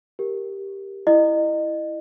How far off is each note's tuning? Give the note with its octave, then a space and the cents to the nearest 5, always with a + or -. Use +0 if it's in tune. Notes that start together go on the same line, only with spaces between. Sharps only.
G4 +0 A#4 +0
E4 +5 D#5 -30